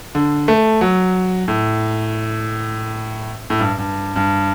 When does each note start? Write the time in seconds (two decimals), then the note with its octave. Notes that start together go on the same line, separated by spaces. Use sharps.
0.15 D3
0.48 A3
0.81 F#3
1.48 A2
3.50 A2
3.60 G2
3.78 G2
4.16 G2